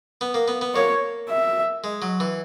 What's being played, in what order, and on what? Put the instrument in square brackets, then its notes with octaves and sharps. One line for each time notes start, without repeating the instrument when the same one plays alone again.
[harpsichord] B3
A#3
B3
B3
[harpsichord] A#3 [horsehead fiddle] C#5
[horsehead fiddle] E5
[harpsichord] G#3
F#3
E3